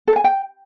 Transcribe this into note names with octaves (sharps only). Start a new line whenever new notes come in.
A4
G#5
G5